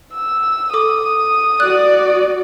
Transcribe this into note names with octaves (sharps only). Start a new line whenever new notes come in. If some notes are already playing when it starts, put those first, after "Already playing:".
E6
A4 D6 D#6
F#4 D5 F#6